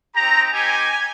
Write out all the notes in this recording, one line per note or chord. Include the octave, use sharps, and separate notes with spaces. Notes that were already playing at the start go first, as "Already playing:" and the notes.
C4 D#4 G4 A#5
C4 D#4 G4 G#5